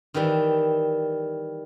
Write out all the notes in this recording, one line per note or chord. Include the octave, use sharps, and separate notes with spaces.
D#3 E3 G3